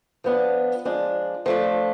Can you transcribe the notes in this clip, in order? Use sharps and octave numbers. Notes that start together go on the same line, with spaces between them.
F3 B3 D4
F3 G#3 D4
F3 A3 D4